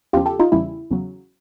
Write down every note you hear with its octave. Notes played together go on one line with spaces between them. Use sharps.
E2 C#3 F3 F4 G4
G4 A4
D#4 F4
E2 C#3 E3 G3 E4
E2 C#3 F#3